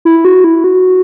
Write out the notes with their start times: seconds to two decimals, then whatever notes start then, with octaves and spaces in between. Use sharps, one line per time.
0.05 E4
0.25 F#4
0.44 E4
0.64 F#4